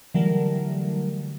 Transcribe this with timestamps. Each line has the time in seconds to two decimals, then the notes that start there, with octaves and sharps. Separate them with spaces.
0.14 D3 E3 F#3 G3 A3 A#4